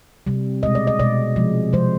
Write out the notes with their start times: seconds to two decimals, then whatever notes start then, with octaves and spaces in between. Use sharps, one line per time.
0.27 C3 G3
0.63 B2 G#3 D#5
0.75 D5
0.87 D#5
0.99 B2 G#3 D5
1.36 C3 F3 G#3
1.73 C3 F3 G#3 C5